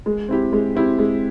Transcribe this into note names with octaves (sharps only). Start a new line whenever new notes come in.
G#3
C4 E4 G4
G#3
C4 E4 G4
G#3